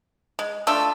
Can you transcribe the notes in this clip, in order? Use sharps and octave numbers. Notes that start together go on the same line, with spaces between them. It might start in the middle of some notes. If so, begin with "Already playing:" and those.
G#3
A3 D4 F4 E6